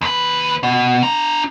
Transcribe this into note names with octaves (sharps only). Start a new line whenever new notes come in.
D#2 B4
B2
D4 A#5